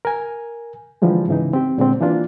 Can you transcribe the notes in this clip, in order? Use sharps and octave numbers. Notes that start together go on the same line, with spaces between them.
A#4 G#5
D3 E3 F3 G3 G#3
G#2 C#3 E3 D#4
C4 G4
A#2 D3 G#3 A#3 C4
E3 A#3 D4 F4